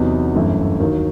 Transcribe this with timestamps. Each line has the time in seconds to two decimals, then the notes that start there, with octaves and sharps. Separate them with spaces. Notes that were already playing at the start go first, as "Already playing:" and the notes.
Already playing: E2 C3 F#3 B3 D#4
0.35 G1 F#2 E3 A3 E4
0.80 D#2 D#3 F#3